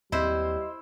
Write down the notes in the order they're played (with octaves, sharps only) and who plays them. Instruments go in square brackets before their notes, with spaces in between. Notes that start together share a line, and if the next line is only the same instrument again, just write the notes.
[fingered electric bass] D#2 C4 [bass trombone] G3 [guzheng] E4 C5 [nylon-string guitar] D#5